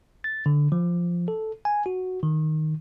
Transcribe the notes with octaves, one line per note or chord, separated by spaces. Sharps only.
A6
D3
F3
A4
G#5
F#4
D#3